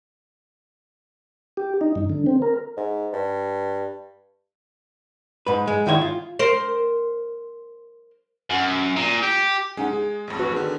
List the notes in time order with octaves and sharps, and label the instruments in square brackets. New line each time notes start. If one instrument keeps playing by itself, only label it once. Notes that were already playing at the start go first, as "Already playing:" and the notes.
[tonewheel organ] G4
D#4
G2
D3
C4
A#4
[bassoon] G#2
G2
[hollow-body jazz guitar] G#2 B4
G#3
G#2 D#3 E4 B4 C#5
F4
[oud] A#4 C5
[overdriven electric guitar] F#2
A#2
G4
[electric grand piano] G#3 [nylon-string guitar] C#4 D#4 F#5
[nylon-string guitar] G#4
[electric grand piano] A1 F2
[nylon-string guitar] F#4 B4
[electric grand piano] D3 D#3 B3 [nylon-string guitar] G#4